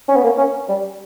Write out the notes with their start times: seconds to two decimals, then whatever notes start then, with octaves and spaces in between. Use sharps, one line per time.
0.08 C#4
0.16 B3
0.23 A#3
0.37 C#4
0.69 G3